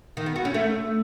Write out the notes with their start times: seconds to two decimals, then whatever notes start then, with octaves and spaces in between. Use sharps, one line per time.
0.17 D#3
0.26 B3
0.36 F#4
0.45 C#4
0.54 A3